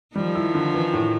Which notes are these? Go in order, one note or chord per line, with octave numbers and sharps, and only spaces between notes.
D#3 F3 G3
E4
D3
E3
A2